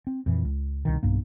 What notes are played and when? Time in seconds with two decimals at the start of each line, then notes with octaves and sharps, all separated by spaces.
0.07 C4
0.26 F2 A#2 E3
0.45 C#2
0.85 C2 B2 D#3
1.03 B1 G2 A#3